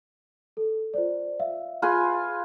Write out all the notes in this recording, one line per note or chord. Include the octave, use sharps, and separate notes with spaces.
A4
F4 C5 D5
E5 F5
F4 G#4 B4 G#5